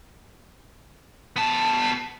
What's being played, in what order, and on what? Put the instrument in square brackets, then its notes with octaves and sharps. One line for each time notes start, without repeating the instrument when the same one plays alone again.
[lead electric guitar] B3 A5